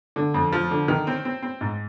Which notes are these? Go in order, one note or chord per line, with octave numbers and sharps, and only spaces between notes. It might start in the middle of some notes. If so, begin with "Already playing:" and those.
D3
F2
F3
D3
D#3
C4
C4
C4
G#2